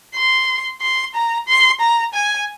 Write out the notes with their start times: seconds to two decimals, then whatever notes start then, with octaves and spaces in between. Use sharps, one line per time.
0.15 C6
0.81 C6
1.15 A#5
1.48 C6
1.81 A#5
2.14 G#5